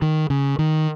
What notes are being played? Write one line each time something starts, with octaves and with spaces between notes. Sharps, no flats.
D#3
C#3
D#3